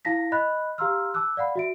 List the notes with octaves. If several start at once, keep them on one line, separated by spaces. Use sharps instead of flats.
E4 F5 A5 A#6 B6
D#5 B5 F#6
G4 F5 A#5 C6 E6 F6
A5 D6 E6 F#6
D5 F5 F#5 B5
F#4 E5 D7